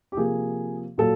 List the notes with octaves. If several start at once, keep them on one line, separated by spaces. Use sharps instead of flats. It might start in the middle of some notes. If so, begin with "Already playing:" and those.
G4
C3 F3 A#3 G#4
A#2 F#3 A4